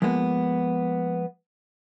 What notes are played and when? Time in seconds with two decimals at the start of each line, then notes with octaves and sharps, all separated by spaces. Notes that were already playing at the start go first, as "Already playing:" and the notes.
0.02 F3 G#3 A#3 B3